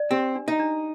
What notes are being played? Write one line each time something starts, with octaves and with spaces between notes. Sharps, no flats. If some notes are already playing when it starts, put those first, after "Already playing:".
Already playing: D5
C4 G4
D4
D#4
D4